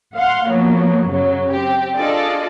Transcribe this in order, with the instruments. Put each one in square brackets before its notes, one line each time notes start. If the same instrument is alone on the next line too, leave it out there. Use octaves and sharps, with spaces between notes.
[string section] F5 F#5 C6
F3 F#3 A#3 B3
F#2 C#3 F#3
C4 G4
D4 F4 G#4 A4 D5 D#5